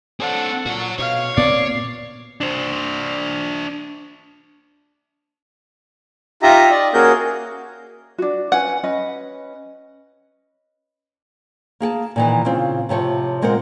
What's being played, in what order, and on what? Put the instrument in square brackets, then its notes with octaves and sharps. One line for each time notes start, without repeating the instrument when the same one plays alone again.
[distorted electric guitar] C4 D4 [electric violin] A4 F#5
[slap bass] A#2 [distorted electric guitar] F#4 C#5
[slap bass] B2 [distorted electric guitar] C#5 [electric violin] F5 F6
[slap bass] A#2 B3 C4 [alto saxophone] D5 [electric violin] C7
[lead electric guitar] D4 C5
[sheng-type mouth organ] D#4 F4 G4 D#5 E5 A#5
D5 D#5
A#3 C#4 F#4 G#4 A#4 G6
[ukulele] D4 F#4
[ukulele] C#4 B4 G#5 [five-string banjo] F#5
[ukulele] C#4 B4 D#5
[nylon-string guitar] A#3 G#4 G5 A5
A#2 D#3 E3
A#2 C#3 C4
A2 C3 F3 C#5
A#2 G#3 C4 A#4 F#5